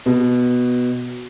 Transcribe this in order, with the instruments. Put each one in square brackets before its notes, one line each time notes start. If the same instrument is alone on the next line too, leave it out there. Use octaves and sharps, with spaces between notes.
[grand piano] B2